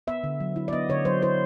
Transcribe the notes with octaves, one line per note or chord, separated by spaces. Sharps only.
B3 E5
D3
F#3
E4
D5
B3 D#5
D3 C#5
F#3 C5
E4 C5